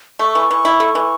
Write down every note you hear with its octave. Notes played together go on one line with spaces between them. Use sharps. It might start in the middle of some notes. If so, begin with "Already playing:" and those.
A3 C#6
E3
E3
E4
A3
E3